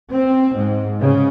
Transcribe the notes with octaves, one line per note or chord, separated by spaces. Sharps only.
C4
G#2
C#3